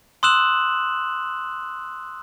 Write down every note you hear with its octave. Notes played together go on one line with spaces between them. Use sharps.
C6 D#6 E6 F#6 E7 F#7